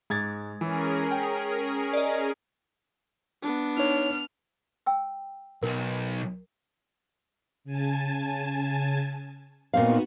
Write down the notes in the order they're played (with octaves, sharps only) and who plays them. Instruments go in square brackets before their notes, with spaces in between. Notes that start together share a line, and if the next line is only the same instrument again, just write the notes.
[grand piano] G#2 G#6 A6 [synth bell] G#3
[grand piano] E3 [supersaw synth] C#4 G#4 A#4
[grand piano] G5
[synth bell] D5 D#5
[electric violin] B3 D4
[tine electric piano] D#4 C#5 [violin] F6
[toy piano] G5 E6
[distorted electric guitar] B1 [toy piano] A#4
[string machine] C#3 G#5 A5
[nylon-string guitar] A#2 C4 F5 [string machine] B3 D#4 F#4